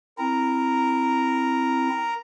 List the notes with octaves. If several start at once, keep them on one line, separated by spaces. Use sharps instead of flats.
C4 E4 A#4 A#5